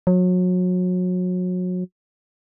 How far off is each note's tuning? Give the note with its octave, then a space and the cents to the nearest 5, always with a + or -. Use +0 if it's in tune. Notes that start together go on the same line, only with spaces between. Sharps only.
F#3 -30